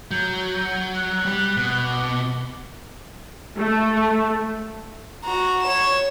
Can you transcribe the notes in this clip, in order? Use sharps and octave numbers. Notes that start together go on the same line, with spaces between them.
F#3 G6
G6
F#6
G3
B2
D6
A3
F#4 A#5
C#5 E7